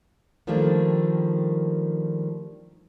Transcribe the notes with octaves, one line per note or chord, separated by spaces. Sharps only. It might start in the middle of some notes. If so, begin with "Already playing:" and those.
D#3 F3 G3 A3 A#3 D4